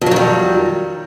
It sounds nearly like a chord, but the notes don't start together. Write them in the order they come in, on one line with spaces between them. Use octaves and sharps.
F2 F#3 D#3 G3